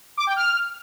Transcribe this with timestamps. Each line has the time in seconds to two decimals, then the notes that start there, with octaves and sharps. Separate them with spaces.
0.17 D6
0.27 G5
0.36 F6